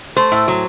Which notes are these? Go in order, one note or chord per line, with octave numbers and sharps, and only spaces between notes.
A3 C5
A2
F#3